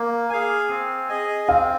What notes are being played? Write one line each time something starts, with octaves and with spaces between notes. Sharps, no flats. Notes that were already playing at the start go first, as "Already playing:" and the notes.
Already playing: A#3
G#4 F5 G#5
C4
G#4 D#5 G#5
C4 F5